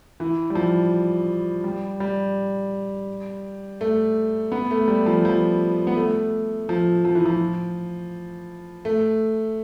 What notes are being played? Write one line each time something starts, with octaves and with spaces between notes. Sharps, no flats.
E3
G3
F3
G3
G3
A3
B3
A3
G3
F3
F3
B3
A3
F3
F3
E3
F3
A3